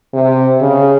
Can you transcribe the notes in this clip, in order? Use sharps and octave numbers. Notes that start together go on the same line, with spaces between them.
C3
C#3